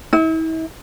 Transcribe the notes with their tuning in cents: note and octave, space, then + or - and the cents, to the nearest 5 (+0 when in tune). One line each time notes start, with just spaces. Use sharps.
E4 -40